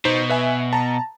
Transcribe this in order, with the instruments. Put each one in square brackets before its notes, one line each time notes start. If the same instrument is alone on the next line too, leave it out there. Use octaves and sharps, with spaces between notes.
[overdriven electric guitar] B2 [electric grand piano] D#4 C5
[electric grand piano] B4 E5 G#5
A5 A#5